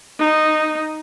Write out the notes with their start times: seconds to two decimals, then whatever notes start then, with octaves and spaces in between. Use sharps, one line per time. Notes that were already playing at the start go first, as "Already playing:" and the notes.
0.19 D#4